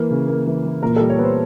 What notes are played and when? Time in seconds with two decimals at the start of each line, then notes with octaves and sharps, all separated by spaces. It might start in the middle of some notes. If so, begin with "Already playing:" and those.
Already playing: E3 A#3
0.11 C#3
0.28 A#3
0.46 E3
0.65 E3
0.83 A#2 A#4
0.96 G3 A4
1.10 C#5
1.18 B3 C5